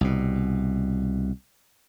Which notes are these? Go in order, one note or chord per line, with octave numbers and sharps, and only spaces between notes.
C2 B2